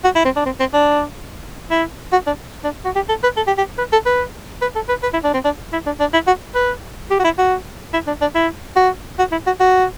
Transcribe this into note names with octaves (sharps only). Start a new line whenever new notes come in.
F#4
E4
C4
D4
C4
C4
D4
E4
F#4
D4
D4
F#4
G4
A4
B4
A4
G4
G4
B4
A4
B4
B4
A4
B4
B4
E4
D4
C4
D4
E4
D4
D4
E4
F#4
B4
G4
F#4
E4
F#4
E4
D4
D4
E4
F#4
F#4
E4
F#4
F#4